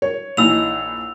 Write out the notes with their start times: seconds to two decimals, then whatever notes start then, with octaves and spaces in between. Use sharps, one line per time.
0.02 C#5
0.37 A#1 E3 D#4 E6 F7